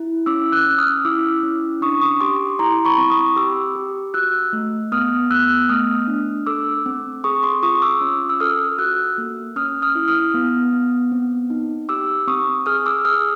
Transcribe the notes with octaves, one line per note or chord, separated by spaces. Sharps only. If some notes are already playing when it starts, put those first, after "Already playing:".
Already playing: E4
C#4 D6 E6
E6 F#6
C#4
D#6 F6
E4 D6 E6
C#4
D4 C#6 D#6
C#6 D#6
G4 C6 D6
E4 A#5 C6
B5 C#6
C4
C#6 D#6
G4 D6 E6
G4
F#4 E6 F#6
A3
B3 D#6 F6
B3 E6 F#6
A3 D#6 F6
D4
A4 D6 E6
C4
G#4 C#6 D#6
C6 D6
F4 C#6 D#6
D6 E6
C#4
E6
A4 D#6 F6
F#4 E6 F#6
A#3
C#4 D#6 F6
D#6 F6
E4
D#6 F6
B3
B3
C4
D#4
G4 D6 E6
C4 C#6 D#6
G#4 D#6 F6
D6 E6
G#4 D#6 F6